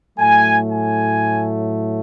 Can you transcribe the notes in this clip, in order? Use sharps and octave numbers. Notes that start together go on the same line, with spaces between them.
A2 F#3 A3 G#5
G#5